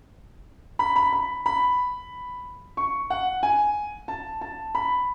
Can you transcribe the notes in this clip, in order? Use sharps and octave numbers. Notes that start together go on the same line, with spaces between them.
B5
B5
B5
B5
C#6
F#5
G#5
A5
A5
B5